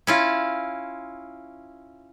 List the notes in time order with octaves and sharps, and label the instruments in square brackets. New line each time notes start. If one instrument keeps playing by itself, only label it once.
[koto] C#4 E4 F4